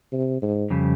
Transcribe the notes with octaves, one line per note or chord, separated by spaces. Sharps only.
C3
G#2
F2 C#3 G3